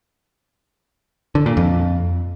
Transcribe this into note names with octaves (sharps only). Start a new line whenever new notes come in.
D3
A#2
F2